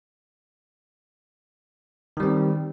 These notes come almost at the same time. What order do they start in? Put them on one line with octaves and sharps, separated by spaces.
D#3 G3 C4